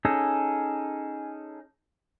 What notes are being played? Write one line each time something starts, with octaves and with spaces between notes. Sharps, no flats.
C#4 D#4 G#4 A4